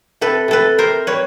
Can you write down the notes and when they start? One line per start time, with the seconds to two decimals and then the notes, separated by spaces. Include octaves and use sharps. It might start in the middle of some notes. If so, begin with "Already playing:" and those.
0.21 C3 A4 B4
0.48 C3 A4 B4
0.78 C3 A#4 C5
1.07 G3 B4 C#5